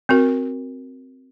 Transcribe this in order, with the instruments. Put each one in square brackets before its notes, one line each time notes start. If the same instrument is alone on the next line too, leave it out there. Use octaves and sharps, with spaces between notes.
[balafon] C4 F#4 A#4